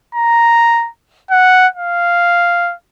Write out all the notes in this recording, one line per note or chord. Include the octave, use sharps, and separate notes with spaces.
A#5
F#5
F5